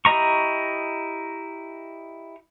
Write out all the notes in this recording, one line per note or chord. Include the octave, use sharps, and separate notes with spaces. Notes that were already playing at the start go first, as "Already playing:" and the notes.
E4 G4 D#5 A#5 C#6